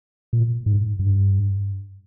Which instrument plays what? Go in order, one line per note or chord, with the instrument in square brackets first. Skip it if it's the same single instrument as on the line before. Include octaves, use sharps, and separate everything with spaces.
[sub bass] A#2
G#2
G2